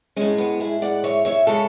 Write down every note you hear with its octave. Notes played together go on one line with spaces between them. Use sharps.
A2 G#3 C#4
B3
E4 G#4
D5 F#5
C#5 E5
C#5 E5
C#3 G#3 A4 C#5